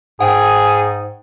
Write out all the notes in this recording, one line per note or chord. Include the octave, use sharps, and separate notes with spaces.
G#2 G#4 F#5 G5